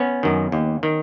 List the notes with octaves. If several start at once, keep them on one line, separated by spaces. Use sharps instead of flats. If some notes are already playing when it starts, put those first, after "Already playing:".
Already playing: B3 C#4
F#2 D#3
D#2
D#3